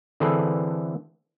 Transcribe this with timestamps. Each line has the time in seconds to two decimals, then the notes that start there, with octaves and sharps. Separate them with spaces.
0.20 D3 E3 C4 G#4 A4 B4